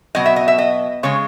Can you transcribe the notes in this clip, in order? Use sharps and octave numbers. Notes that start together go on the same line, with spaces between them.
B2 F#3 D#5
E5
D#5
E5
D#5
C#3 G#3 C#5